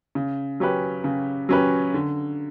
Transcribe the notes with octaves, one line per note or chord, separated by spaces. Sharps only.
C#3
F#3 C#4 G4 B4
C#3
F#3 C#4 G4 B4
D3